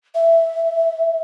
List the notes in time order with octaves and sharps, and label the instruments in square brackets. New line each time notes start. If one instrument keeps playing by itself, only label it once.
[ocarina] E5